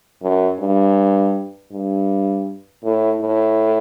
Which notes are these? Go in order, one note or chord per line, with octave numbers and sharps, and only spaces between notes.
F#2
G2
G2
A2
A2